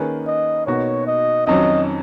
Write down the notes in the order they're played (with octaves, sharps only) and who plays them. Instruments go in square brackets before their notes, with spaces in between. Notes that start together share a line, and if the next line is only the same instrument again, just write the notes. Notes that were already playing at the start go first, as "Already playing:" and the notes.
Already playing: [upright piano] D#3 A#3 C#4 G#4 B4
[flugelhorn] D#5
[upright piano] B2 A#3 D#4 F#4 [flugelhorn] C#5
[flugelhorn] D#5
[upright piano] F2 D#3 F#3 C#4 [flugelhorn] D#5